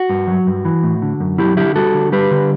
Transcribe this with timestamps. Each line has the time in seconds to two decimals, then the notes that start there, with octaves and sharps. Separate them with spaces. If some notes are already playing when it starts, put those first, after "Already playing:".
Already playing: F#4
0.09 G2
0.27 F#3
0.47 G2
0.65 E3
0.83 A2
1.02 D3
1.20 F#2
1.38 F#3 E4 G4
1.57 D3 E4 G4
1.75 G3 F#4 A4
1.94 D3
2.12 G3 G4 B4
2.31 D3